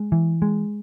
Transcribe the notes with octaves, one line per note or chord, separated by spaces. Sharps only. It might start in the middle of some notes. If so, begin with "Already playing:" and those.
Already playing: G#3
E3
G#3